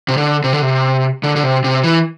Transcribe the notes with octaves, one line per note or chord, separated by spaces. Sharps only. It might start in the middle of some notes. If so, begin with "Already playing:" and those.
C3
D3
C3
D3
C3
D3
D3
C3
C3
E3